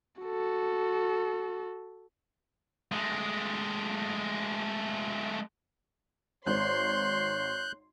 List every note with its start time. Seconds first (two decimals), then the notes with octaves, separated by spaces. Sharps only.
0.22 F#4 A4
2.92 G#3 A3
6.47 G#1 C#5 C6 F#6 G6